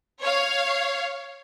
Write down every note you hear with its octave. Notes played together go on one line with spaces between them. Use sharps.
C#5 F5